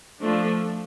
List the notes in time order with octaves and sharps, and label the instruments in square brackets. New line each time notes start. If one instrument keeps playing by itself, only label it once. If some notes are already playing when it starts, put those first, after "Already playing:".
[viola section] F3 A3 D4